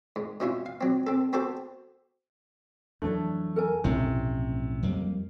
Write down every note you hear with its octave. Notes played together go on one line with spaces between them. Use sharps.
G#2
B2 C#4 E4 F4
F5
F#3 C4
C4 A4
B3 F#4 G4 A4 C5 A5
F2 E3 F#3 A3 D4 C#5 D5
A4 A#4 G#5
B1 F2 A2 C3 C#4 G#5
F2 F#3 G3 A#3